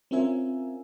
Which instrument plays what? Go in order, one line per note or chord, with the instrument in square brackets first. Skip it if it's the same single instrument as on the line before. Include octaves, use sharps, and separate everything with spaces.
[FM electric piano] C4 C#4 F4 A#4 E5 G#5